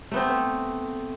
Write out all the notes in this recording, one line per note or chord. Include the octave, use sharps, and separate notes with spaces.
A3 B3 C4